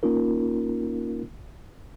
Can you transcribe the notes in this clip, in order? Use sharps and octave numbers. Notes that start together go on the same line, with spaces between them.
A#3 C#4 D#4 F4 A#4